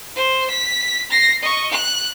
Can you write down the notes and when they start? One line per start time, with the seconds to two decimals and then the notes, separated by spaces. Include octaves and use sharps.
0.16 C5
0.50 B6
1.11 A#6 C7
1.42 D#5 C#6
1.71 F#6